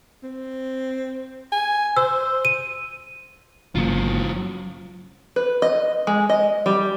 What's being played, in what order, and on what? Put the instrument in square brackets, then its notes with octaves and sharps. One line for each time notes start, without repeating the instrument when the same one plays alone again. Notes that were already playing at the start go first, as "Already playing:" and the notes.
[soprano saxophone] C4
G#5
[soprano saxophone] C5 [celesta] E6
[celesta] D#7
[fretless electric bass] G1 C#3 A#3 [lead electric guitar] F#3 F4
[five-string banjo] B4
D#5
G#3
D#5
G3